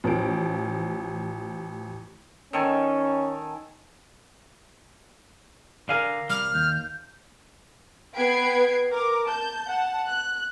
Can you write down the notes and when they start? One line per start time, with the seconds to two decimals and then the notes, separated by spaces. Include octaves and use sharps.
0.04 A1 F3 D7
2.53 D#3 C#4 A4 G#5
5.89 D3 A#4 F5 G#5
6.30 C2 G3 F6
6.54 D#2 G6
8.16 B3 B4 G5 G#6 C7 D7
8.91 A#4 D6
9.25 A5 G6
9.67 F#5 A5
10.07 F#6